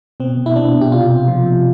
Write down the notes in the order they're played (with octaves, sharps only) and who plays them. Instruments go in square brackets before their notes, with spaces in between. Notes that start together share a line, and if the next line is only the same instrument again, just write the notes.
[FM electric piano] B2 C4
B2
E4
B2 D4
B2
G4
C3 F4
C3
F3
C3